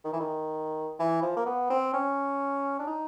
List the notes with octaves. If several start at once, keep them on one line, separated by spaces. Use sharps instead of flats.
D#3
E3
D#3
E3
F3
A#3
B3
C4
C#4
D4
D#4